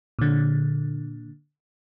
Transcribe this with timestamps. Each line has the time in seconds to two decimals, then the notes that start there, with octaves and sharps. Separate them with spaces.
0.19 A#2 D3